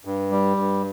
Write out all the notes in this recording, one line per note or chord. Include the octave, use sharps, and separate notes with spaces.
G2
G3
G2